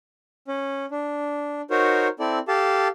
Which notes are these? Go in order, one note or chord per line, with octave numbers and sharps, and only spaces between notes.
C#4
D4
D#4 F#4 A#4 C5 C#5
C4 E4 A4 D5
G4 A4 F5 A5